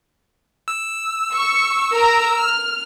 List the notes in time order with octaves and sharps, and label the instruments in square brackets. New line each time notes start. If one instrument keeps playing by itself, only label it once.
[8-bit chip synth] E6
[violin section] C#6
A#4 A#5
F6